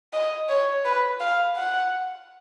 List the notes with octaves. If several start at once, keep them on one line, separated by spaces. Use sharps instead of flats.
D#5
C#5
B4
F5
F#5